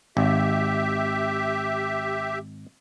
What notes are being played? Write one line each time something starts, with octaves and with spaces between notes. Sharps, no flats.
G#1 G4 E5